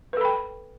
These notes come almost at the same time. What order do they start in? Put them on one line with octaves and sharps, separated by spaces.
B4 A4 B5 G5